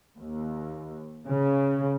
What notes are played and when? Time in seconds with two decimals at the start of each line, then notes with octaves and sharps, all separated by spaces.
0.19 D#2
1.27 C#3